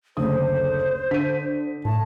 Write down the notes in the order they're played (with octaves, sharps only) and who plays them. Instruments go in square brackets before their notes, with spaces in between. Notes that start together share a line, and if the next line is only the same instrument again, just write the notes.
[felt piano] F#1 D2 D#6 [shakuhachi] C5
[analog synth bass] D3 [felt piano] B6 D#7
[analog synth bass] A2 [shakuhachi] A5